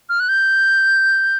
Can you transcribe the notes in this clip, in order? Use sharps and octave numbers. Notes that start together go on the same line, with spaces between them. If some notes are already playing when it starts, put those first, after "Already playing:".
F6
F#6
G6